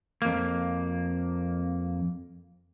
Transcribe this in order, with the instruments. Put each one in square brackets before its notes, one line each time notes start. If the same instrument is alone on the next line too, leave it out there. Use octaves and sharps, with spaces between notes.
[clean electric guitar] F2 A#3